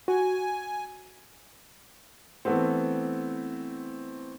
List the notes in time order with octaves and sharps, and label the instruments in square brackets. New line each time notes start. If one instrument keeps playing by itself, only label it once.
[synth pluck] F#4 [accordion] G#5
[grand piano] E3 A3 B3 C4